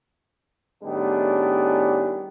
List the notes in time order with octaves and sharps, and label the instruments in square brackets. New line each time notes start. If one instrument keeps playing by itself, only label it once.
[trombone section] A2 D#3 G3 B3 D4 G#4